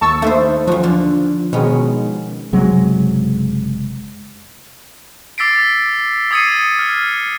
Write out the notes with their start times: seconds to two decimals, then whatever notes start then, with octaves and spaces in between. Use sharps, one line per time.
0.01 D#2 A5 C#6 E6
0.22 D#3 A3 B4 C5
0.67 F#2 F3 F#4
0.83 D3 F4
1.53 B2 D#3 G#3 B3 C#4
2.52 F#1 C3 F#3 G#3
5.38 D6 E6 A6 B6 C7 D7
6.31 D6 D#6 G#6 C7 C#7 D#7
6.79 F6